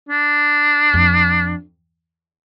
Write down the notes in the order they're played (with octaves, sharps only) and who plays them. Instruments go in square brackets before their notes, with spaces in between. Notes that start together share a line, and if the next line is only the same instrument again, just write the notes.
[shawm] D4
[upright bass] F2